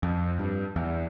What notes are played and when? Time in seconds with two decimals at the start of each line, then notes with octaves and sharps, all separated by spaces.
0.03 F2
0.39 G2
0.76 E2